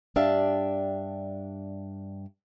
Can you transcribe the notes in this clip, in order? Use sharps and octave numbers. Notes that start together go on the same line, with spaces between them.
G2 D4 G4 E5 F5 A5